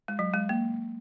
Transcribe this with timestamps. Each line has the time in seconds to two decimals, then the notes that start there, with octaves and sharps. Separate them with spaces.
0.08 G#3
0.19 F#3
0.34 G#3
0.49 A#3